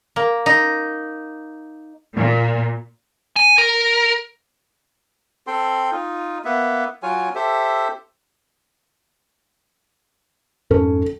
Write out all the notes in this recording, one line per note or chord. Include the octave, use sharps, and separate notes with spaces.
A#3
D#4
A#2
G#5
A#4
C4 A4 G5 C6
D#4 F4
A#3 B3 E5
F#3 F4 C#5 G#5
G4 A4 C5 E5
F2 G#2 C#4 A4